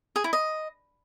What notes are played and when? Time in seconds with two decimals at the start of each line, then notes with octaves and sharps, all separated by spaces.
0.16 G#4
0.24 E4
0.33 D#5